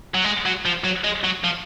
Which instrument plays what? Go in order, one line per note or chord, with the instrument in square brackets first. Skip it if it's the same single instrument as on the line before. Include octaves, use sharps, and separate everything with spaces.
[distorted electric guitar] F#3
G#3
F#3
F3
F#3
G#3
F#3
F3